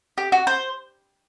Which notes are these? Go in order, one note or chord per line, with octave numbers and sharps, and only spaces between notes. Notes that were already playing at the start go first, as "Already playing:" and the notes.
G4
F#4
C5